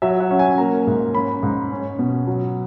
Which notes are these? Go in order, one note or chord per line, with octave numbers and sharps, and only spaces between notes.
F#3 E5
F#5
C#4
G#5
A#3 A#5
G#2
C#4 B5
G#2
C#4
B2
F#3